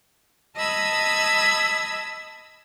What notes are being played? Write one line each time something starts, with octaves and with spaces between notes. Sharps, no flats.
D#5 A5 B5 D#6 E6 G#6